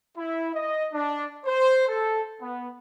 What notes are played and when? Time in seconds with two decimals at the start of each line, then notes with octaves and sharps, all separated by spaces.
0.17 E4
0.55 D#5
0.93 D4
1.45 C5
1.88 A4
2.42 B3